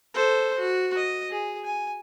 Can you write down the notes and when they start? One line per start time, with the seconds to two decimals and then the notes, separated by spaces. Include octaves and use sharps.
0.14 A4 C5
0.58 F#4
0.96 D#5
1.31 G#4
1.64 G#5